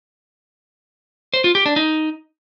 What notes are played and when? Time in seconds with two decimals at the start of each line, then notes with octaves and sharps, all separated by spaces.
1.34 C5
1.44 F4
1.55 G4
1.66 D4
1.76 D#4